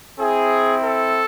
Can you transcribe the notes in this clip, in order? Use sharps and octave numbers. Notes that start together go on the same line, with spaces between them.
C4 E4 G#4
A4